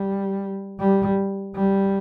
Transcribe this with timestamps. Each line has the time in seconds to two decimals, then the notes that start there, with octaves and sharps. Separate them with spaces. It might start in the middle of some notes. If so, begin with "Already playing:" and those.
Already playing: G3
0.79 G3
1.55 G3